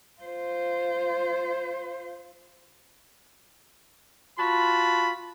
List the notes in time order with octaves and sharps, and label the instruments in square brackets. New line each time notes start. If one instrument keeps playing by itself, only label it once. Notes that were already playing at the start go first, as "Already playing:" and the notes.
[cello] F4 C5
[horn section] F4 F#4 A5 B5